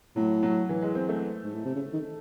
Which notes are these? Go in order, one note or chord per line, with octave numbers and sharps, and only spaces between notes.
A2 F#3
F#3
E3
G#3
C4
A3
G#2
A2
C3
C#3
D#3